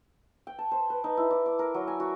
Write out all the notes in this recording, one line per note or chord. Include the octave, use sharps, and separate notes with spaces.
G5
A5
C5
B4
D#4
E4
D5
D6
A#4
F#3
G#5
F#4